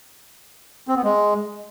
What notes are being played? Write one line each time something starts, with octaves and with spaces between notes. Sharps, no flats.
C4
B3
G#3